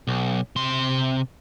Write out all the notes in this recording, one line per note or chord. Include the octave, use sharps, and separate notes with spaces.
B1
C3 C6